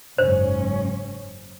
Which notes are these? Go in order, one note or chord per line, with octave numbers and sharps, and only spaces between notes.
F#1 G#2 C#4 C5